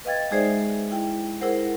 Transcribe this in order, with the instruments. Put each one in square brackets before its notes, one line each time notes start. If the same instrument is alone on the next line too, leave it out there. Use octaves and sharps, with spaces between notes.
[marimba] B4 D#5 F5 G5 G#6 A6
G#3 D#4 G#4 C5 D5 E5
E4 G5
E4 G#4 A#4 C5 F#5